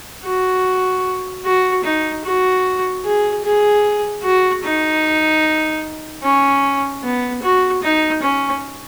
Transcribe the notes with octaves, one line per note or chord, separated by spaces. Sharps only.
F#4
F#4
D#4
F#4
G#4
G#4
F#4
D#4
C#4
B3
F#4
D#4
C#4